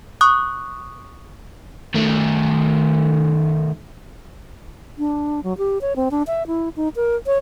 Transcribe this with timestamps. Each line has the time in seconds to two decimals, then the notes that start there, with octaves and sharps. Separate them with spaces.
0.21 C#6 D#6 F#6
1.94 D#3 A3
4.98 D4
5.44 F#3
5.58 G4
5.81 C#5
5.96 C4
6.11 D4
6.27 E5
6.47 E4
6.76 D#4
6.96 A#4
7.26 C#5